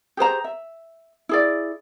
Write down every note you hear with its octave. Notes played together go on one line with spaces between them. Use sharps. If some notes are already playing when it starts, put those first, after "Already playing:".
G4 G#4 C5 A#5
E5
E4 G#4 D5